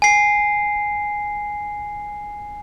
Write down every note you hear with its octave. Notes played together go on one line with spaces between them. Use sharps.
G#5 C7